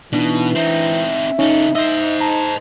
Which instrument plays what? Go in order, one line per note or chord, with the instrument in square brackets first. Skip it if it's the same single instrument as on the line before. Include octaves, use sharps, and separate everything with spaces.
[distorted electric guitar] B2 [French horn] E3 [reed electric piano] D4 [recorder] D#4
[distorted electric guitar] C4 D#4 [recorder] E5
[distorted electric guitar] C#3 A4 [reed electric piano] C#4 [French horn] D#4
[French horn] D#4 [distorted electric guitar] C5 D#5 [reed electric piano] E5
[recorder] A5 [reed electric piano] A#5